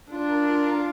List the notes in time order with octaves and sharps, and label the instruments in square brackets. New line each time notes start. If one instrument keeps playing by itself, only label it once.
[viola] D4 [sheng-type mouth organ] F4
[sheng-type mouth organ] A#4
F4
F5